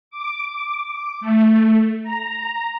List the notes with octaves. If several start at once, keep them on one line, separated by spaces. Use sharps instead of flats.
D6
A3
A#5